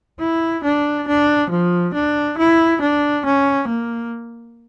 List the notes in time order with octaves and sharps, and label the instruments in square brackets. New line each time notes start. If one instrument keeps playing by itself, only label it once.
[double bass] E4
D4
D4
F3
D4
E4
D4
C#4
A#3